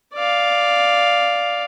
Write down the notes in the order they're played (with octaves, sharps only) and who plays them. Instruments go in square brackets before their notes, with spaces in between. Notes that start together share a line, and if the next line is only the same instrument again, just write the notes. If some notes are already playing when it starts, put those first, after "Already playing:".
[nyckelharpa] D5 F5